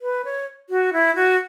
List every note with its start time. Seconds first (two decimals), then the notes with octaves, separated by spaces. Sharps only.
0.01 B4
0.25 C#5
0.70 F#4
0.93 E4
1.15 F#4